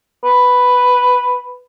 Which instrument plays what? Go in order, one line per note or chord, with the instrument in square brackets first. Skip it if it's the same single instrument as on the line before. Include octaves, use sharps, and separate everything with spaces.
[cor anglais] B4